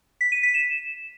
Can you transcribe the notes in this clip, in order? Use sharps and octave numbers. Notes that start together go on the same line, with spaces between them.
B6
D#7
B6
E7